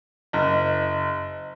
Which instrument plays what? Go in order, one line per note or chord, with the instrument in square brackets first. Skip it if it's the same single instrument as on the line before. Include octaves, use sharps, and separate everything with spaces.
[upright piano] F#1 [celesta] D#5